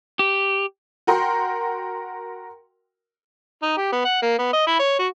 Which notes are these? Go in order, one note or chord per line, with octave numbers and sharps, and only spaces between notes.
G4
F#4 A#4 G5 C6
D#4
G4
B3
F#5
A#3
B3
D#5
E4
C#5
F#4